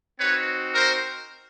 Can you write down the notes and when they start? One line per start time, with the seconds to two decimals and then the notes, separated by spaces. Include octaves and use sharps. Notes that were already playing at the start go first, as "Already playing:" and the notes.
0.19 C4 D#4 F#4 B4 C#5
0.74 A#4 C5